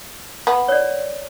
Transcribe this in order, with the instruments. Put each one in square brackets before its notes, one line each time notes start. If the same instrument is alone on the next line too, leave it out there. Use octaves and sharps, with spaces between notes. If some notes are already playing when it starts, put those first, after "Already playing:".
[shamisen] B3
[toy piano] C#5 D5